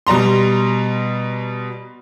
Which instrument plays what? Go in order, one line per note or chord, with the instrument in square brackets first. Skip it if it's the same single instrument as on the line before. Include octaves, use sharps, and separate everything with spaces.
[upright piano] B2 G3 A#5 C6